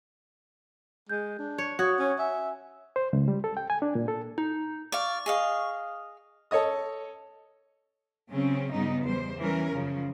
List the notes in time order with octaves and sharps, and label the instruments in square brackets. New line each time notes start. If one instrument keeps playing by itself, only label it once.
[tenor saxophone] G#3 [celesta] G6
[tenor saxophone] D4
[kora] C#5
[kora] F#4 [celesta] C#5 D#6 G#6
[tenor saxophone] C#4
[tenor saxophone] E5 [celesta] G#5
[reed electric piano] C5
C#2
G3
A4
G5
G#5
D4
A#2
A4
[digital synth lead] D#4
[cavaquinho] D5 F5 [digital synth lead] C#6
[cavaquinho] G#4 D#5 F5
[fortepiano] A4 C#5 D#5 D#6
[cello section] C#3 F#3 C4 C#4
G2 C#3 F#3 G3 B3 D#4
E2 G3 C5
E3 G3 C#4 A#4
F#2 C#3 F3